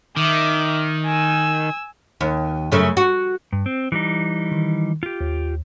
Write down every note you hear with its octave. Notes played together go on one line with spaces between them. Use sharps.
D#3 E5 D6
G#5 E6
D#2
F#2 C#3 A3
F#4
G2
C4
E3 G3 D#4
D#3
F4 G4
D#2